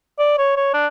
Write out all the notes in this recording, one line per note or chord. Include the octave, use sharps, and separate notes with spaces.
D5
C#5
C#5
D4